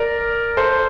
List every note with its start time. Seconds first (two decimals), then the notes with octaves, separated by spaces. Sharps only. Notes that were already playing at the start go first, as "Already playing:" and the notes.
Already playing: A#4 D5
0.57 A4 C5